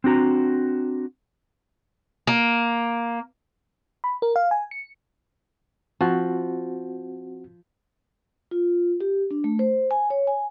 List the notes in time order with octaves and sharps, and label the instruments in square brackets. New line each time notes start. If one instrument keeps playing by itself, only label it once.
[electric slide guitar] C4 D4 F#4 A#5
[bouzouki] A#3
[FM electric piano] B5
A#4
F5
G#5
C#7
[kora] F3 [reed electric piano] C4 F#4
[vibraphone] F4
G4
D4
A3
C5
G#5
C#5
G#5